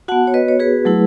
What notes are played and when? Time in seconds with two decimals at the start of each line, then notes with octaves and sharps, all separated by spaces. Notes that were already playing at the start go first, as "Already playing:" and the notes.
0.08 B3 F#4 F#5 A5
0.27 C#5
0.34 B4 D#5
0.48 C#5
0.60 G#4 B4
0.85 F#3 A3 E4